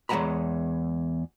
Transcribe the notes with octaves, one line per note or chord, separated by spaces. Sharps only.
E2 G#3 C#5 F#5 A#5 B5